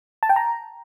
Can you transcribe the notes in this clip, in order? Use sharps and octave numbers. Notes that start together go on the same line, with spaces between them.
A5
G5
A#5